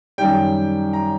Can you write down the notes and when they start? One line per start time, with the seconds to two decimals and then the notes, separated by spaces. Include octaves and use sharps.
0.18 F#2 D#3 G3 G5
0.93 A#5